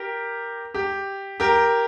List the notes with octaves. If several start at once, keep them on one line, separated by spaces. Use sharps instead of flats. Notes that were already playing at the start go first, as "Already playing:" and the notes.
Already playing: G4 A#4
G4
G4 A#4